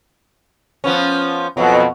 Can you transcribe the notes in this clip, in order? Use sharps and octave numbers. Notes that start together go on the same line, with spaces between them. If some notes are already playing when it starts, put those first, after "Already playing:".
F3 B3 C#4
F2 B2 F#3